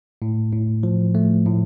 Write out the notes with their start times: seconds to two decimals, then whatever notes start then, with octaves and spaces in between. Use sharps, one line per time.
0.22 A2
0.52 A2
0.83 F3
1.15 A3
1.46 A2